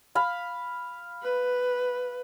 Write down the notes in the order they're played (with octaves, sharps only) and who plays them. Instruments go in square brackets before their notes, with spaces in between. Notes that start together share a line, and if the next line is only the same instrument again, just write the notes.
[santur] F5 B5
[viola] B4